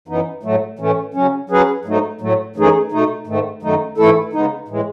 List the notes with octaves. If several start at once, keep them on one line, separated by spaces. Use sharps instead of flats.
F#2 E3 B3 D#4
A2 F#3 A3
A2 E3 A3 C#4
C#3 F#3 C#4
F#3 C#4 G#4 B4
G#2 F#3 A3 D#4
A2 F#3 A3
F#2 E3 A3 D#4 G#4
B2 A3 D#4
G#2 D#3 A3
F#2 D#3 F#3 A3 D#4
G#2 E3 A3 E4 A4
C#3 G#3 B3 D#4
A2 E3 G#3